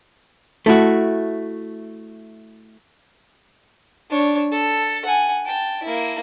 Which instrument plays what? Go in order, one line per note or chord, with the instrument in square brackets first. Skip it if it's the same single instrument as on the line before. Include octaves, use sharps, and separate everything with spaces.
[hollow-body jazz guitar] A3 E4 F#4
[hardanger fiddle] D4 C#5
A4
F#5 G#5
G5 A5
A#3 E4